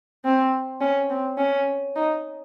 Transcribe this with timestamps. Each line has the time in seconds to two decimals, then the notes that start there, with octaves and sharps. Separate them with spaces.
0.25 C4
0.81 C#4
1.10 C4
1.38 C#4
1.96 D#4